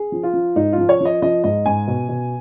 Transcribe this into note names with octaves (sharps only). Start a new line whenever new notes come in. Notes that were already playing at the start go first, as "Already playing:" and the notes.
Already playing: G#4
F3
F4
F3
G#2 D#4
F4
F3
C#5
F3 D#5
F3 D#5
G#2 D#5
G#2 G#5
B2
B2